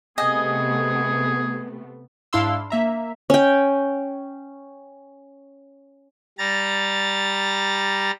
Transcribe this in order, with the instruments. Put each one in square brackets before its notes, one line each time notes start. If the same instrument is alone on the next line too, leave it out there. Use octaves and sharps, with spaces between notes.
[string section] C3 A3 B3 [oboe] G#4 [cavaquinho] D#5 G#5
[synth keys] G#2 D4 E4 F5 C6 E6
A#3 E5 A#5
[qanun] C#4 G5
[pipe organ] G3 A#5 A6